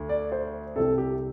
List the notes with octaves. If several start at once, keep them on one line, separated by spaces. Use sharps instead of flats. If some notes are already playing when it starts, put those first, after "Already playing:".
Already playing: D2
D5
C5
C2 C3 A4
G4